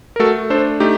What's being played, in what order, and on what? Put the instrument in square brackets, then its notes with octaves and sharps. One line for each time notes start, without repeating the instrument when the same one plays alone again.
[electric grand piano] A#4
A3 F#4 A4
D4 A4 C5
A3 D#4 G4